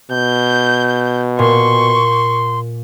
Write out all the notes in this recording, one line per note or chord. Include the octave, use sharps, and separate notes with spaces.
B2 G6
A#2 C6 C#6